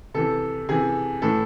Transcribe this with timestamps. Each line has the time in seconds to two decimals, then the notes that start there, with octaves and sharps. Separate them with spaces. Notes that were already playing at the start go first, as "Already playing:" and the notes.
0.14 C3 E3 A4
0.69 C3 E3 G#4
1.22 A2 E3 A4